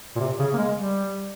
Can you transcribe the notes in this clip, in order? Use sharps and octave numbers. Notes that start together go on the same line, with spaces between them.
A#2
C3
C#3
A#3
G#3
G3